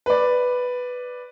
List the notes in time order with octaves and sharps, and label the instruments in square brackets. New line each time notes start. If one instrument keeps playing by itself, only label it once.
[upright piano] B4 D5